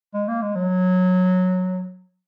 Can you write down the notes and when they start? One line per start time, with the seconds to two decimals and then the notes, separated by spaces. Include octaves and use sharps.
0.14 G#3
0.28 A#3
0.42 G#3
0.55 F#3